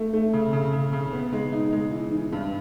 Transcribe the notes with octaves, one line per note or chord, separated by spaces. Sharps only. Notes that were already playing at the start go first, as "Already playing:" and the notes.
Already playing: A3
A3
C#3
C#3
C#3
C#3
B3
G#3
D#4
G#3
E3
E3
G2